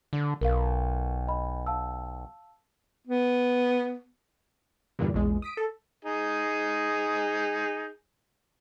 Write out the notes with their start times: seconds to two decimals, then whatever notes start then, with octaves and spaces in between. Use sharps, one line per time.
0.13 D3
0.41 B1 A#4 F5
1.28 D#5 B5
1.66 F5 A5 E6
3.07 B3
4.99 E2 G2 A#2 D3 E3 G3
5.14 A#1 E2 G#3
5.42 D#6 B6 D7
5.57 A4
6.05 D#4 G#4